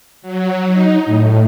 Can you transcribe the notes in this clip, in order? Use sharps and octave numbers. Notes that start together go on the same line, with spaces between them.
F#3
D#4
A2